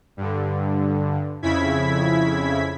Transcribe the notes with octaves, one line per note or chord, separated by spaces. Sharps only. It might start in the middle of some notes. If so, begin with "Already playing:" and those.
G2 D3
F2 C#3 E4 G#6 B6